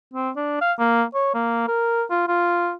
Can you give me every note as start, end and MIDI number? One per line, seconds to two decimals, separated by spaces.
0.14 0.31 60
0.36 0.57 62
0.61 0.73 77
0.79 1.04 58
1.15 1.30 73
1.35 1.66 58
1.68 2.04 70
2.10 2.27 65
2.28 2.73 65